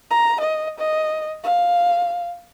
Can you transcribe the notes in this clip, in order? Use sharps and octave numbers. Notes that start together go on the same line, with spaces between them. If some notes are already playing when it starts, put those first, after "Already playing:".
A#5
D#5
D#5
F5